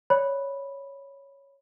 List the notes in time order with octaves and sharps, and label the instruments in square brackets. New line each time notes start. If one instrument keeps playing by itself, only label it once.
[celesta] C#5 D5 B5